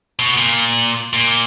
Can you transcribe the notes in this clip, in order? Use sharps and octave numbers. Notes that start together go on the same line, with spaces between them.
B2
A#2
A#2